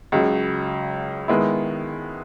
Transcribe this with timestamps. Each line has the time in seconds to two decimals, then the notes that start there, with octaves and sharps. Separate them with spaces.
0.12 C#2 C#3 F#3
1.28 D#3 G#3 B3 E4